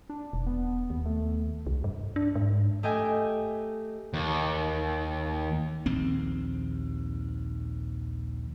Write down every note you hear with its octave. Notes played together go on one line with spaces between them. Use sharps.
D4
E1
B3
D#2
A3
C2
G2
D4
G#2
A3 G4 D#5 G5 G#5 G6
D#2
A#1 D#2 C4